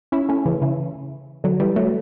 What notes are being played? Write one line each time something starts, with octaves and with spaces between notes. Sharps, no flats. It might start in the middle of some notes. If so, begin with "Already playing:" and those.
C#4 E4
A3 C#4
C#3 E3
C#3 E3
D3 F#3
E3 G3
F#3 A3